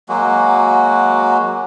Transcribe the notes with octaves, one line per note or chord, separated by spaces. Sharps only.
F#3 G#3 A#3 F#4